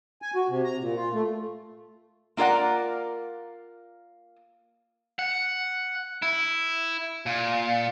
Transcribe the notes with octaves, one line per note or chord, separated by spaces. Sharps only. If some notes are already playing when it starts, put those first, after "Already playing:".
G#5
F#4
C3
A#5
A#2
F4
A3
A#3 F4 A#4 D5 F#5
F#5
E4
A#2